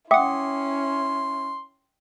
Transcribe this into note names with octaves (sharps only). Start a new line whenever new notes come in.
C#4 E4 E5 F#5 G5 C6 D6 D#6